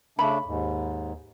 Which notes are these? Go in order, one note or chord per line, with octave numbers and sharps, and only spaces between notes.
C#3 A3 D4 B5
D#2 G#2